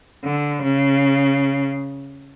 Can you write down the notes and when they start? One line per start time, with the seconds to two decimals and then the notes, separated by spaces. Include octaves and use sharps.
0.24 D3
0.63 C#3